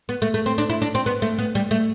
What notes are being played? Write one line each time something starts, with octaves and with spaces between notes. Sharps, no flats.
B3
A3
A3
C4
D4
E4
D4
C4
B3
A3
B3
G3
A3